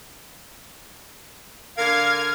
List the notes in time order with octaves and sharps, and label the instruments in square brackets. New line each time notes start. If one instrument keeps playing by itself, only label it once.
[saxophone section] D3 A#4 [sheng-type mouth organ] F5 [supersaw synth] F6 G#6